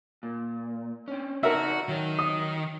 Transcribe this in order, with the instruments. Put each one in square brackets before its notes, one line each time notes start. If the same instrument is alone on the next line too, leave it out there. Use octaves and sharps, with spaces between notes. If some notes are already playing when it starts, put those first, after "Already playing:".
[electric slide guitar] A#2
C4 C#4
[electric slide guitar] C#3 D#4 A5 [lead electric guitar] F#4 [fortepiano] A#4 E5
[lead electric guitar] D#3 [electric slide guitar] F#3
[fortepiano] D#6